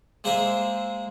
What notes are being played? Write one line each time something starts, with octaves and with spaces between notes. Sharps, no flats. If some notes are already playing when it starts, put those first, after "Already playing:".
G#3 A#3 G#4 C5 D#5 E5